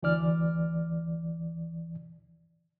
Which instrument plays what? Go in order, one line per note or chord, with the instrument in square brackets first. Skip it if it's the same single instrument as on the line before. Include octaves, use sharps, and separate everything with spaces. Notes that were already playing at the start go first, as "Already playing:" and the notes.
[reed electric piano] D2 E3 D5 F6